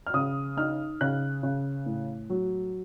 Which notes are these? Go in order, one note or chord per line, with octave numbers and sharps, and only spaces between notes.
F6
C#3 D#6
D#4 F6
C#3 F#6
C#3
A2
F#3